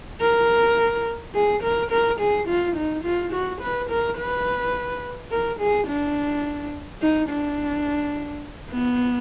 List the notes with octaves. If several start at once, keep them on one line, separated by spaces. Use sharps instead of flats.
A#4
G#4
A#4
A#4
G#4
F4
D#4
F4
F#4
B4
A#4
B4
A#4
G#4
D4
D#4
D4
B3